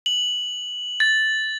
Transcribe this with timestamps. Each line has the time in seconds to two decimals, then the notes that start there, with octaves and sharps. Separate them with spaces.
0.06 F#7
1.00 A6